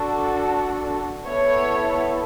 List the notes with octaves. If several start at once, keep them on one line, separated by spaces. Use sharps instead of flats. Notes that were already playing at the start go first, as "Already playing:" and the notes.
Already playing: D4 F#4 A4
B3 E4 A4 C#5